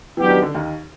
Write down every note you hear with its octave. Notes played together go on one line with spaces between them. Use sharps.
E3 F#3 B3 D4 G4
D#3
D3
D#2 D#3